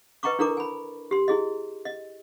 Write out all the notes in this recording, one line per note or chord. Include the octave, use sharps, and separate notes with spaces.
B4 D#5 G5 A#5 C#6 D6
D4 E4 A4 A#4 A#5 D6
G#5 B5
G4 C6
E4 G#4 D#5
D#5